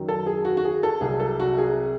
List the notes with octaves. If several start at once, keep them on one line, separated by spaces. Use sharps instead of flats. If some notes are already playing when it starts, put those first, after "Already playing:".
Already playing: F#2 D#3 F#3
A4
G#4
F#4
F#4
G#4
A4
C2 C3 F#3 G#4
A4
F#4
G#4